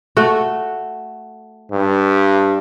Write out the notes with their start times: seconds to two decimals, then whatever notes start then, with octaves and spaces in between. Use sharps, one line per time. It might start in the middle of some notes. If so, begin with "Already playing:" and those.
0.17 A3 F#4
1.72 G2